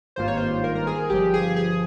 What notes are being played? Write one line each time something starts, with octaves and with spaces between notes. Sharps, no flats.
G#1 G2 D#3 A#3 F4 C5
C#5
C5
A#4
A#4
G#4
G1 G2 F3 G4
G#4
G#4